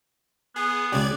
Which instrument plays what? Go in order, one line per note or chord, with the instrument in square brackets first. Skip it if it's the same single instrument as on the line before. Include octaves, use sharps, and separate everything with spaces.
[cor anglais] B3 [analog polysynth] G#4
[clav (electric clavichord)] C#2 C#3 G4 [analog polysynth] D5 G#6